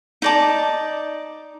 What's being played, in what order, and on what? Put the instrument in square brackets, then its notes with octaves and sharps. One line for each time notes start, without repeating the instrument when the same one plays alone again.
[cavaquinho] D#4 D5 A5